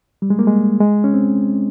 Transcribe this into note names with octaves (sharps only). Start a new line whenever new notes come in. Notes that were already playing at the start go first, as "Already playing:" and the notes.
G3
G#3
A#3
G#3
G#3
C#4
C4